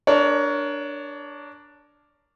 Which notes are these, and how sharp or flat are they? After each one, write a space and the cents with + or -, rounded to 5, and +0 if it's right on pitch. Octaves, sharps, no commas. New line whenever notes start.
D4 +0 A#4 +0 C#5 +20